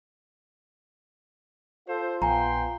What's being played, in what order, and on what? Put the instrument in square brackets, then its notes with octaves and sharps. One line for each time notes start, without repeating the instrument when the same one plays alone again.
[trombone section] F4 [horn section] A4 C5
[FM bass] A#1 [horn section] B3 G5 C6 [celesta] G#5 A#5